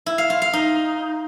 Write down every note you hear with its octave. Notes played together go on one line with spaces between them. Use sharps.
E4
F5
F4
F5
D#4